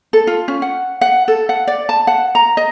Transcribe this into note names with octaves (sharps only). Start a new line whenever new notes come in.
A4
F4
C#4
F#5
F#5
A4
F#5
D5
A5
F#5
A#5
D#5